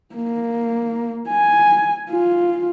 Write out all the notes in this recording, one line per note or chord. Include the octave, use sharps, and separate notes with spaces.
A#3
G#5
F4